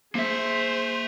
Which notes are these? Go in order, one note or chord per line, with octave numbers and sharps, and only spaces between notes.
A#3 G#4 C5 E5